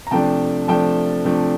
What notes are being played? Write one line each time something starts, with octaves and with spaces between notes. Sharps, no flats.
A#5
C3 F3 A3 D4 G5 A5
C3 F3 A3 D4 G5 A5
C3 F3 A3 D4